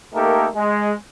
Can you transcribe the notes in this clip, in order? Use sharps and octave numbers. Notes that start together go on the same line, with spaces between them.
A3 A#3 D#4 G4 A4 A#4
G#3